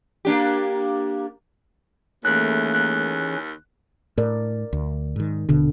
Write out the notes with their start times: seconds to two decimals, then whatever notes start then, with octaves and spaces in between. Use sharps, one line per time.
0.25 A#3 D4 G4
2.25 D#2 E3 A3 A#3 C#4 G#4 F#6
2.74 D#2 F#6
4.18 A2 A#4 D5
4.73 D2
5.16 G#2 D#3
5.49 D#1 B2 D3